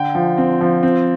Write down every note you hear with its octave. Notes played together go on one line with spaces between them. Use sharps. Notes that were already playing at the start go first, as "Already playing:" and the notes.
Already playing: D3 G5
F3
C4
F3
C4